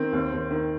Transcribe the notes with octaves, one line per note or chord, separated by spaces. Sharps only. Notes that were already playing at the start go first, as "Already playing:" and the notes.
Already playing: D#3 C4
D#2
D#2
D#3